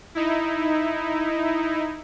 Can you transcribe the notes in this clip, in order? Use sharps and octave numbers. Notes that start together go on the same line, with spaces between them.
D#4 E4